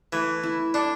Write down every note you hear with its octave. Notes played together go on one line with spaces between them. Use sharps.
E3 A3
E4
D4 A4